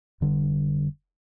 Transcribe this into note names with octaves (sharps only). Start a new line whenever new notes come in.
F1 D3 G3